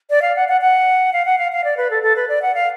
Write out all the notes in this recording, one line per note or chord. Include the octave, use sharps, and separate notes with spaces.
D5
F5
F#5
F#5
F#5
F5
F#5
F5
F5
D5
B4
A4
A4
B4
D5
F#5
F5